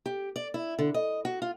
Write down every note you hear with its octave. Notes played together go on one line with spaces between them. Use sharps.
G4
D5
E4
D3
D#5
F#4
F4